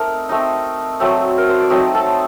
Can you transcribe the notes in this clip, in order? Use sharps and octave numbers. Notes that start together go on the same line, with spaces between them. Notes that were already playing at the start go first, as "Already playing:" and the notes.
Already playing: A3 C4 D#4 A#4 A#5
A3 C4 D#4
F#3 A3 C4
A#4
C5
D5
F#3 A3 C4 D#4 D#5
A4 A5